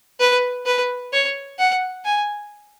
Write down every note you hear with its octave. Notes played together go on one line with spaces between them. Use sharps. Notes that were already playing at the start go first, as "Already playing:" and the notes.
B4
B4
C#5
F#5
G#5